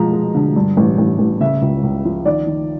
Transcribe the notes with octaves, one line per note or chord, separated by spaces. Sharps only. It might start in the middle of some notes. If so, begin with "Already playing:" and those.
Already playing: B2 F3 G#3 A#5
G#3
D3
G2
A1
A1
A1
C#3 E5
C#2
C#2
F3
D#3 D5
D#3